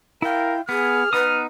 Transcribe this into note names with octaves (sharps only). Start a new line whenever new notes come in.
E4 A#4 F5 G5
B3 G#4 F6
B3 D#4 B4 D#6